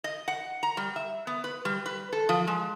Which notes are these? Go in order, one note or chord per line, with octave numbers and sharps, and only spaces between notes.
D#5
F#5
A#5
G3
E5
B3
B4
G3
B4
A4
F3
G#3